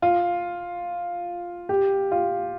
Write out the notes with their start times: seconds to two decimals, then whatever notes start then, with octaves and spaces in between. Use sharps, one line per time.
0.02 F4
1.69 G4
2.12 F4